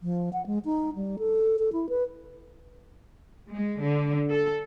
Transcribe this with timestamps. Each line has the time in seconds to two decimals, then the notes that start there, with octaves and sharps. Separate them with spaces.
0.01 F3
0.33 F#5
0.46 G#3
0.65 D#4
0.95 G3
1.19 A4
1.59 A4
1.73 E4
1.89 B4
3.48 G#3
3.82 D3
4.31 A4